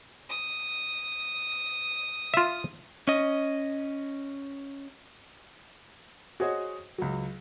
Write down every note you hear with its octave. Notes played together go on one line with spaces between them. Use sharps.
D#6
F4 E5
C#4 D#5
F#4 G#4 C5 C#5 D#5
C#2 F#3